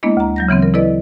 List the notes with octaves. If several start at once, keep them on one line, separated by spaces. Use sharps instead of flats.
G#3 A#3 B3 D4 E4 D#5
D2 A#5
F#3 G6 A#6
C#3 E3 B3 C4
A#4
E4 A4 B4 D5 D#5